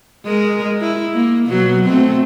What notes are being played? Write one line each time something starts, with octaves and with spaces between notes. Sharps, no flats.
G#3 A#4
E4
A#3
B2 F#3
A3 C4